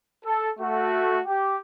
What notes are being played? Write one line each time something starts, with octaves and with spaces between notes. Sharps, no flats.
A4
A3 F#4
G4